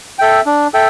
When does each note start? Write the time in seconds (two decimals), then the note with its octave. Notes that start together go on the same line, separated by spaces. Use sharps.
0.19 A4 E5 G5
0.46 D4
0.74 A4 E5 G5